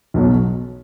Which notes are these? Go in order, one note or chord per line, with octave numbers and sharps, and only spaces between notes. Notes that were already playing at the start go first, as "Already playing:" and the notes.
B1 B2 F#3